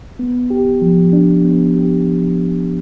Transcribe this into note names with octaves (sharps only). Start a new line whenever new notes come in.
B3
G4
F3
D4
B3
G4
F3